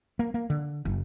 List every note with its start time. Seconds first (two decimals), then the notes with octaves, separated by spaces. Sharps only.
0.19 A#3
0.34 A#3
0.50 D3
0.85 F#1